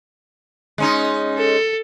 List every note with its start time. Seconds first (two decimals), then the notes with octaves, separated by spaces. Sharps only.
0.78 G#3 C#4 D#4
1.38 A4